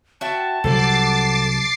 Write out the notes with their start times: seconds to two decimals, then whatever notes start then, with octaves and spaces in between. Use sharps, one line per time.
0.21 F#4 E5 G5 A5
0.64 C2 F#3 A4 C5 F#5 D6 A6 C7